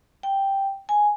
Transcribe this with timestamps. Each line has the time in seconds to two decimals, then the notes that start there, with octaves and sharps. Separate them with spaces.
0.23 G5
0.89 G#5